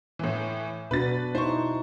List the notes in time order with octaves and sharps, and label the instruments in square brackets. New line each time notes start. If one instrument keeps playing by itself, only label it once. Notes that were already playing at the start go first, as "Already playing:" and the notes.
[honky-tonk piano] A2 E3
[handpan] B2 D4 F#4 [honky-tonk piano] B4 A6
[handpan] D#4 E4 [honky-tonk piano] C5 C#6